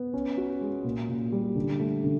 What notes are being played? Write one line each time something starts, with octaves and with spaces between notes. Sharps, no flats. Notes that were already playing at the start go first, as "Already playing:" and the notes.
Already playing: B3
C#4
F#4
G#3
A#2
A#2
G3
D3
A3
D3